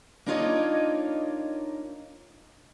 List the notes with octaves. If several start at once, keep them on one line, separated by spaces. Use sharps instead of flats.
A#3 D4 D#4 F4 C#5 D#5